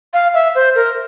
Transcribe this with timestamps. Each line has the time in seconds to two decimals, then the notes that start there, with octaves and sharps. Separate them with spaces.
0.14 F5
0.34 E5
0.55 C5
0.75 A#4